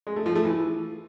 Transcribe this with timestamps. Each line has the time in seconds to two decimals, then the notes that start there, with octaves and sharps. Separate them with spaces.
0.07 G#3
0.16 A3
0.26 F3
0.35 A3
0.45 E3